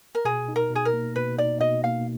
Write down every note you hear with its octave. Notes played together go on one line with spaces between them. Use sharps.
A#4
B2 G#4
D#4
A#4
B2
G#4
A#4
A#3
B2 B4
D#4 D5
B2 D#5
A#3 F5